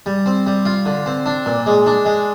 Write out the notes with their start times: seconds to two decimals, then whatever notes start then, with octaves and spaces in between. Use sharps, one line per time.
0.06 G3
0.26 C4
0.46 G3
0.65 F4
0.86 D3
1.06 C4
1.26 D4
1.46 A#2
1.66 G#3
1.86 D4
2.05 G#3